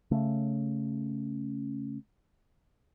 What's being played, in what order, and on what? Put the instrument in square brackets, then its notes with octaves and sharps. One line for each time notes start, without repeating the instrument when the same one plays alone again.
[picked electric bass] C#3 A3